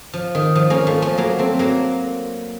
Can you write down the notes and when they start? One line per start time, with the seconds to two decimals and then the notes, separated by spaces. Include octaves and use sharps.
0.13 F3
0.35 D#3
0.55 F3
0.70 A#3 C#4
0.87 F3 A3
1.02 F3 A3
1.18 F#3 A#3
1.39 A3 C4
1.59 F#3 A#3